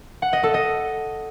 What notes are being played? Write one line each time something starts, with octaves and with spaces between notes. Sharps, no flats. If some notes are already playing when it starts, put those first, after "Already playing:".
F#5
D#5
A4
D#5